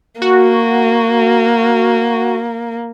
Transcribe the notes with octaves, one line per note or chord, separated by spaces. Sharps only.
A#3 F#4